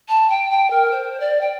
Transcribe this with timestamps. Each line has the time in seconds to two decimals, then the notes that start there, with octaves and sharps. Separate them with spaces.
0.08 A5
0.30 G5
0.50 G5
0.70 A#4
0.91 C5
1.20 D5
1.41 G5